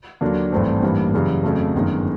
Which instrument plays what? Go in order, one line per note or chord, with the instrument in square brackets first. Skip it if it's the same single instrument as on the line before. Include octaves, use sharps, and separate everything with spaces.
[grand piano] D#2 D3 F#3 A#3 D4
G#1 G2 E3 A3 C4
A1 G2 E3 G3 A#3
F#2 C#3 E3 G3
F2 C#3 F#3 A3
G1 F#2 D#3 G#3